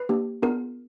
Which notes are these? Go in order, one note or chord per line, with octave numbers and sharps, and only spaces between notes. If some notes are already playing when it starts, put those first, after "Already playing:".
Already playing: B4
A#3 D4 G4
B3 D4 F4 G#4 A#4